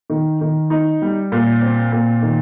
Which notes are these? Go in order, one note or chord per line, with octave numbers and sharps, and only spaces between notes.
D#3
D#3
D#4
G3
A#2
C4
A#2
D#3